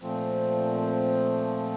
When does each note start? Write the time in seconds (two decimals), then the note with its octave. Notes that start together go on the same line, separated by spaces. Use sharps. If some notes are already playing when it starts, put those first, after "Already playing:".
0.02 A#2 F3 A3 C4